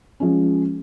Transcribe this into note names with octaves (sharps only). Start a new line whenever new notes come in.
F3 G#3 C#4